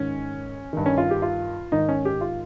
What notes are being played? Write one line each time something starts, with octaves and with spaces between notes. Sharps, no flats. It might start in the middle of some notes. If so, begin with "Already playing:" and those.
Already playing: G#2 D#3 C#4
G2 D#3
C#4
F4
G4
F4
G#2 D#3 D#4
C#4
G4
F4